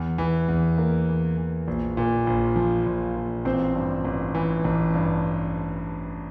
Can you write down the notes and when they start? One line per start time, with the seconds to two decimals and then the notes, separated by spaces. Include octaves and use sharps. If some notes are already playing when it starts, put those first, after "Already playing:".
Already playing: E2
0.18 E3
0.48 E2
0.78 A#3
1.08 E2
1.37 E3
1.67 A#1
1.97 A#2
2.27 A#1
2.56 F3
2.86 A#1
3.16 A#2
3.45 A1 C4 C5
3.75 G2
4.05 A1
4.35 E3
4.64 A1
4.94 G2